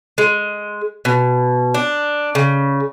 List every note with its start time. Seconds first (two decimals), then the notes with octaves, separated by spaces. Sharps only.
0.18 G#3
1.05 B2
1.74 D4
2.35 C#3